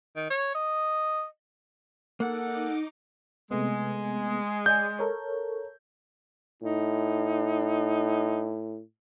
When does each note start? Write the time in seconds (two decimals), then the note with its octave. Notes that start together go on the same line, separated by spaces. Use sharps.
0.16 D#3
0.30 C#5
0.55 D#5
2.20 A#3 D#4 A4 F#5 D6
3.51 C3 G#3 A3 B3
4.66 D5 D#5 G#5 G6
4.99 A4 A#4 C#5
6.63 A2 D#4